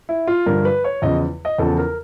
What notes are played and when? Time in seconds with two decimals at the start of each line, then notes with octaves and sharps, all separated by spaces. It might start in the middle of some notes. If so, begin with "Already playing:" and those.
0.09 E4
0.27 F4
0.46 G2 D3 F3 A#4
0.65 B4
0.84 C#5
1.02 E2 C#3 F3 D#5
1.45 D#5
1.58 E2 C#3 F3 A4
1.78 A#4